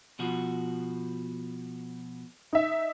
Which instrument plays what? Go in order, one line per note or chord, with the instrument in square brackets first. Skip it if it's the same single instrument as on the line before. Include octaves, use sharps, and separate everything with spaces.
[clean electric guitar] B2 F3 F#4
[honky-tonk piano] D#4 E5